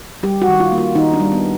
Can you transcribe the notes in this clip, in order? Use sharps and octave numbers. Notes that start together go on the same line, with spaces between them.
G3 G4
F#4
D#3
F4
A#3
F4
D#3 D#4
D4
G3
B3